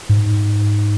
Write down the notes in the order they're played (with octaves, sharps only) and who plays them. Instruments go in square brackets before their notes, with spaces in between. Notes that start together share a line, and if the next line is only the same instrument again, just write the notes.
[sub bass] G#2